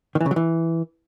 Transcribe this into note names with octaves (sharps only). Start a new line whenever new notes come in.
D#3
E3
C#3
F#3
E3